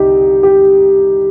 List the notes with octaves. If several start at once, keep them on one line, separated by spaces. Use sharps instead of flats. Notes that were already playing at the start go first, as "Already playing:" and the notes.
Already playing: C2 D#4 G4
G4